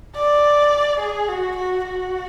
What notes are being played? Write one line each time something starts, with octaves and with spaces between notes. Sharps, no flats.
D5
G#4
F#4
F#4
F#4